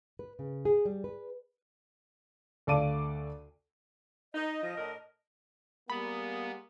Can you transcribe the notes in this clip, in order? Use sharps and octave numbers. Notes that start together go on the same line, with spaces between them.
B4
C#3
G#4
G3
B4
D2 A4 D5 F5 D6 D#7
D#4 D#5
F3
A2 D4 A#4
G3 G#3 A#3 B3 B5